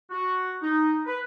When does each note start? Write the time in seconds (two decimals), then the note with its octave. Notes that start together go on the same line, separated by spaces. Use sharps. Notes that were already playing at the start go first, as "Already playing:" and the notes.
0.10 F#4
0.62 D#4
1.06 B4